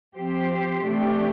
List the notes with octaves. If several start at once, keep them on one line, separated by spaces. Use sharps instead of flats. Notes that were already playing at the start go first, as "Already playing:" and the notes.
F3 C4 G4 C5
C3 E3 A3 D4 G4